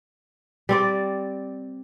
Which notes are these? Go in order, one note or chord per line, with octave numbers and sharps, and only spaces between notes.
G3 C4 D5